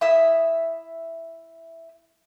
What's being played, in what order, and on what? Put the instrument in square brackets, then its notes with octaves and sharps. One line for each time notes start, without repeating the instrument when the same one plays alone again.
[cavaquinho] E4 E5 D#6